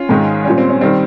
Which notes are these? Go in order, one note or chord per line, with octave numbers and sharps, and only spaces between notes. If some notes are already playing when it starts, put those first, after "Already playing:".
Already playing: C#4 F4
G#2 D#3 G#3
A#2 G3 C#4
C4
C#4
D#3 G3 C4